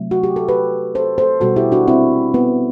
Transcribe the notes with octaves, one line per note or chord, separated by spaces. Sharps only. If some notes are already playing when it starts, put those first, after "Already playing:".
Already playing: C3 F#3 A3
F#4
G4
A4
G4 B4
A4 C5
A4 C5
B2 G3 F#4 A4
E4 G4
D4 F#4
C4 E4
B3